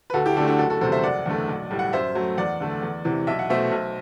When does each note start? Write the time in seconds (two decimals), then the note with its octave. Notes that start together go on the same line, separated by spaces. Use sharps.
0.10 B4
0.14 D2 F#4 A4
0.26 E4 G4
0.36 D3 D4 F#4
0.40 A3
0.47 D4 F#4
0.58 F#1 F#4 A4
0.70 F#4 A4
0.81 E2 C3 G3 A4 C5
0.92 C5 E5
1.03 F#1 D5 F#5
1.26 E2 D3 A3
1.48 B1
1.70 A2 G3
1.79 F#5
1.93 F#2 C5 E5
2.15 F#3 A3
2.38 E2 D5 F#5
2.60 D3 A3
2.82 E2
3.05 C3 E3
3.27 B1 E5
3.39 F#5
3.50 B2 A3 C5 E5
3.71 B1